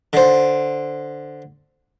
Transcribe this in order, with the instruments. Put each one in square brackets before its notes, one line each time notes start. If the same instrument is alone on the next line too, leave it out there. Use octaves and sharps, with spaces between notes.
[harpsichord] D3 C5